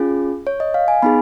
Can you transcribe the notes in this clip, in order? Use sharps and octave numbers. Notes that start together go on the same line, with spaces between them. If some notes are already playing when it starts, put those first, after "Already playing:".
Already playing: C#4 F4 G#4
C#5
D#5
F5
G#5
B3 D#4 G#4 B5